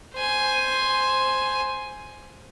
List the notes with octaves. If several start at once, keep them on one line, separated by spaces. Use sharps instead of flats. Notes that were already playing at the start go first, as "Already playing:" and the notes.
C5 G#5